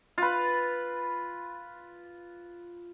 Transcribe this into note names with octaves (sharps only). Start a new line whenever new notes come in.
F4 B4